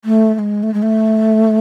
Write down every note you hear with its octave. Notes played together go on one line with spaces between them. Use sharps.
A3
A3
G#3
A3
G#3
A3